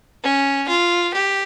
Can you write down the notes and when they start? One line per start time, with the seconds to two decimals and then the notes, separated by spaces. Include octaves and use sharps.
0.23 C#4
0.68 F4
1.13 G4